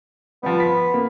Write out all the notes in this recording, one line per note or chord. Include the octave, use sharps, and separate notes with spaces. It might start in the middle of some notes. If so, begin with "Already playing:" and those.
F3 G3 B3
B6
A#3